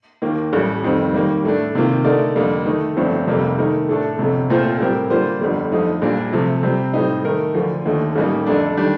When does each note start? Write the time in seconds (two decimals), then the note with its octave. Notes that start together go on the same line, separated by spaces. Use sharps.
0.22 D#2 D#3 A#3
0.53 A1 A2 G3
0.83 F1 F2 D#3 G3 C4
1.14 D#2 D#3 G3 A#3
1.44 A2 A3 D4
1.75 C3 D#3 A#3 F4
2.04 D3 A3 D#4 A#4 D5
2.36 F2 D3 G3 A#3
2.66 D#3 A3 D#4
2.97 G1 G2 F3 A3 C4
3.27 F1 F2 C3 G3 A#3
3.58 D#3 A3 D#4 A#4
3.88 A2 A3 D4 A4
4.19 G1 F2 C3
4.50 A#2 A3 C4 F4 C5
4.79 A2 G3 C4 G4 A#4
5.10 D3 G3 A#3 F4 C5
5.41 G1 F2 D3 G3
5.72 F2 D3 F3 A3 D#4
6.02 A#1 A#2 G3 D4
6.33 C3 F3 A3
6.63 C3 G3 C4
6.94 A2 G3 C4 D#4
7.24 D#3 A3 D#4 A#4
7.54 D2 D3 F3
7.85 D#2 D3 A3 D#4
8.16 A1 A2 G3 A#3 D#4
8.46 F2 D3 A3 D4
8.77 D#3 G3 D4